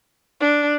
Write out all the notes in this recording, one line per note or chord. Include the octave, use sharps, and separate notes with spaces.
D4